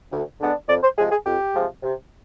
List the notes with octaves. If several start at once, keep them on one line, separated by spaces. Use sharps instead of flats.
D2
D3 G#3 B3 D4
F2 D5
C5
C3 F3 G#3 G#4
G#4
F2 G4
C3 F3 G#3
C3